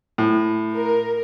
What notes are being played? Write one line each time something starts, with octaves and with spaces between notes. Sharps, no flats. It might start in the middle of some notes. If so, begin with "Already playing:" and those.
A2
A#4